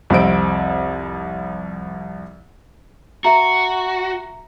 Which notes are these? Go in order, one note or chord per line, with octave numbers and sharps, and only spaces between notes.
C2 F2 C4 D7
F#4 E5 A#5